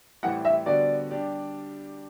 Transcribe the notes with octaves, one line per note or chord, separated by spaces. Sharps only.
A2 E3 G3 C4 E4 F#5
E5
D3 G3 B3 F#4 C5 D5
G3 D4 G4 D5